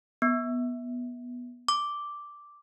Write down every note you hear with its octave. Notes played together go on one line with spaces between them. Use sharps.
B3
D6